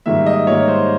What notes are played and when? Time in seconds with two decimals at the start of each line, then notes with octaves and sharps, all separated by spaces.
0.06 G#2 D#3 G3 A#3 E5
0.26 D#5
0.47 G#2 D#3 G3 A#3 C#5
0.68 C5